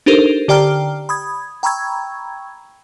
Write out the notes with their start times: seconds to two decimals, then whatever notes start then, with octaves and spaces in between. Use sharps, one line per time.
0.06 D4 D#4 G4 A4 A#4 C5
0.48 D3 G4 D5 G5 A#5 F6
1.09 B5 D#6 G#6
1.63 G5 A#5 B5 C#6 E6 G#6